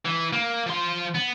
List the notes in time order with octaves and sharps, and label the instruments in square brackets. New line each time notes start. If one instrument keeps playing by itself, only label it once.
[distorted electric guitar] E3
A#3
F3 C6
B3